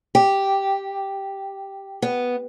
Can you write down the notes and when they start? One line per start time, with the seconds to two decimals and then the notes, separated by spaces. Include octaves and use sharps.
0.15 G4
2.02 B3